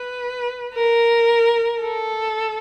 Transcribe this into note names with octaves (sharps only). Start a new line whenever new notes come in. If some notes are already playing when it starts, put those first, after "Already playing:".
Already playing: B4
A#4
A4